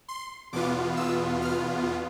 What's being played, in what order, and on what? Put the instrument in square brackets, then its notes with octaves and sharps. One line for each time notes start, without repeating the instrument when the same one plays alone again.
[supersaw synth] C6
E2 B2 B3 F4 D6
E6
F6